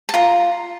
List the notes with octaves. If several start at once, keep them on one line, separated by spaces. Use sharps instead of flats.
A5
F4 A#5